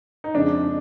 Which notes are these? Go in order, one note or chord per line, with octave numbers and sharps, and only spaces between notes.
D#4
F2 C#3 F3 G#3 D4